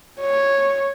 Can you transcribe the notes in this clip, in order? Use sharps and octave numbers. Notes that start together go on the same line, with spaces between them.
C#5